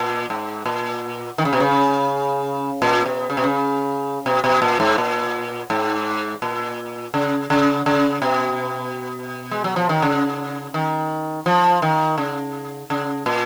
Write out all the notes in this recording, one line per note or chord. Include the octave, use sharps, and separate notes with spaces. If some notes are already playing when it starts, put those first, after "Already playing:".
Already playing: A#2
G#2
A#2
D#3
C#3
B2
C#3
A#2
B2
C#3
B2
C#3
B2
B2
A#2
G#2
A#2
G#2
A#2
C#3
C#3
C#3
B2
G#3
F#3
F3
D#3
C#3
D#3
F3
D#3
C#3
C#3
A#2